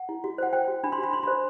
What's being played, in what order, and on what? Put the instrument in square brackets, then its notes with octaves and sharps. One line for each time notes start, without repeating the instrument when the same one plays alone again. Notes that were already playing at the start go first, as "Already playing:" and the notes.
Already playing: [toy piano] F#5
E4
F#4
C5 F#5
C5 G5
F#4
D4 B5
C6
F#4
B5
D4 C6
C5 B5